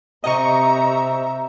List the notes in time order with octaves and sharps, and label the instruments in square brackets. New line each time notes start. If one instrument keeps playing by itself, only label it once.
[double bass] C3 [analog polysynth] D#5 C#6 [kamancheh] E5 A#5